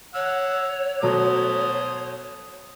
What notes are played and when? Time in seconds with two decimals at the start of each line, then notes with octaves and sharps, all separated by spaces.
0.15 C#5 F#5 E6
1.02 B2 F#3 A3 C5 D#6